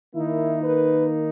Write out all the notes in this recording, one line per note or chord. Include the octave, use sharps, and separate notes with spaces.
D#3 A#3 D#4 E4
B4